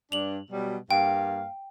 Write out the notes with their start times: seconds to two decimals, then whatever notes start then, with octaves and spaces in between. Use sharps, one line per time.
0.12 G2 D4 F7 F#7
0.51 B2 F#3 G3
0.91 G2 A#3 F5 G5